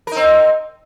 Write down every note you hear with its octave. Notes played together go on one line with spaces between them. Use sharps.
C4 D#4 A#4